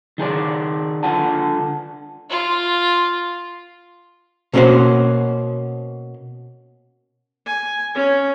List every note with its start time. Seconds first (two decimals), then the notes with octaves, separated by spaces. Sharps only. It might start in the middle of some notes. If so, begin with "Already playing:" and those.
0.18 D#3 D#4 G#4 D5
1.03 D3 F4 F#5 A5
2.30 F4
4.53 B2 A#3 C#4 F4 F#4 C5
7.47 G#5
7.95 C#4